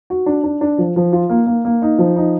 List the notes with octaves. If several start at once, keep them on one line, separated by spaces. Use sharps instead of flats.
F#4
D4
D4
D4
F3
F3
F4
A#3
A#3
A#3
D#4
F3
D#4